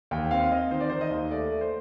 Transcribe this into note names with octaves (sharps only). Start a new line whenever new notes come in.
D#2 G5
C4 F5
C4 D#5
D#3 C5
D5
D#3 C5
D#5
D#2
A3 D5
A3
C5